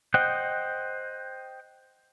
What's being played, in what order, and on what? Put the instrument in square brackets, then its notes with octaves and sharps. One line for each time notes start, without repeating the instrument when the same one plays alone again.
[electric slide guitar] C5 D#5 F#5 G5